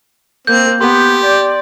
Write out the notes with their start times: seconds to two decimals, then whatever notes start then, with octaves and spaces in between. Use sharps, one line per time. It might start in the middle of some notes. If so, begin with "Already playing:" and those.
0.47 A#3 C4 G6
0.81 B3 G4 C6
1.24 D5